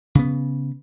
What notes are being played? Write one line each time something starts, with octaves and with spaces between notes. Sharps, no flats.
C#3 B3